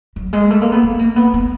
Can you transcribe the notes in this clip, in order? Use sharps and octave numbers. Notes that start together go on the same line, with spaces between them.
F#3
G#3
A3
A#3
B3
B3
A#3
B3
B3